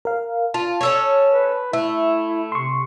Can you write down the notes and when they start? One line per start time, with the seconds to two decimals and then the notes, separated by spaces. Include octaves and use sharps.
0.05 A#4 F5
0.54 F4 A5
0.81 C#4 A4 C#5
1.30 B4
1.73 A3 E4 E5
2.52 C3 C6 C#6